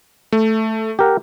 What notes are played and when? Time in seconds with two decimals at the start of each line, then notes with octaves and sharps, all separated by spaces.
0.32 A3
0.99 G4 A#4 F#5